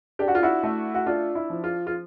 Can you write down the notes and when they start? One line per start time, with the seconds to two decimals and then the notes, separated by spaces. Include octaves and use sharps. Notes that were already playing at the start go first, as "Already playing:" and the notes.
0.19 D4 G4
0.28 F#4
0.35 F4
0.43 E4 F#4
0.63 A3
0.94 F#4
1.06 D4 F4
1.35 E4
1.50 F3
1.64 F4
1.87 F4